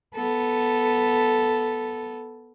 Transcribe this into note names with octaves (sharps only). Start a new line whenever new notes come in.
B3 A4